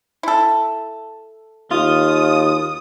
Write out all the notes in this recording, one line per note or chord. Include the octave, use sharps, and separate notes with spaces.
E4 A4
D#2 F4 D#6